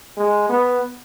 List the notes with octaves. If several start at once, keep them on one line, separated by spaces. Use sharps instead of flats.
G#3
B3